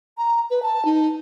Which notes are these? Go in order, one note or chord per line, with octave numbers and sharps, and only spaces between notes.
A#5
B4
A5
D#4